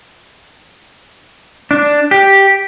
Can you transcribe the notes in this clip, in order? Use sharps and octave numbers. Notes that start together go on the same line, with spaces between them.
D4
G4